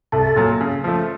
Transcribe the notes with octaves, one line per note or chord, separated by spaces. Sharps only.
C2 A4
A#2 F#3
C#3
F3 A3